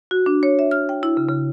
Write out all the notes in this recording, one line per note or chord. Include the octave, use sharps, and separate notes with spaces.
F#4
D4
C#5
E5
F6
G5
E4
C#3
C#3